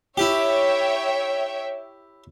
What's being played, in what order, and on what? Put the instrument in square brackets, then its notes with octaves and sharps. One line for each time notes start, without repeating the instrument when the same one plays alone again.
[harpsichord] E4 G4 [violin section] C#5 E5 G5